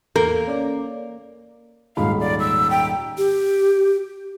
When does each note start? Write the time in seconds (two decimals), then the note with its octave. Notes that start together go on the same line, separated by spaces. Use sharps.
0.16 E2 A#3 A4 A#4
0.47 C#4 D5
1.97 D#1 G#2 F5 B5
2.20 D5
2.40 E6
2.70 G5
3.18 G4